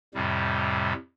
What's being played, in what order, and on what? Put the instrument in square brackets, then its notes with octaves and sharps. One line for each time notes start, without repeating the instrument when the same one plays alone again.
[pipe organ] F2 A2 C3 G3